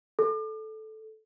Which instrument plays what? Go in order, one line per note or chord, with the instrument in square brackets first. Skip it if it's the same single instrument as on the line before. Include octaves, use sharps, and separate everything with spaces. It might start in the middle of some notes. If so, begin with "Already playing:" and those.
[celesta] A4